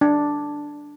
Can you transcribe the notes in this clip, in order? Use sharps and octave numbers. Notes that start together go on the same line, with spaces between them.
D4